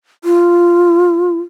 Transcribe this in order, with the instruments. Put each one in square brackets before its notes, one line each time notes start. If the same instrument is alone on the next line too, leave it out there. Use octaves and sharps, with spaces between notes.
[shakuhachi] F4